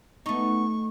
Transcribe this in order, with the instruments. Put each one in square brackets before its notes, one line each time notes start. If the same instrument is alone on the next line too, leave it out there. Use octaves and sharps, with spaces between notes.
[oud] A3 D#4 [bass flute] B3 [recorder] C#6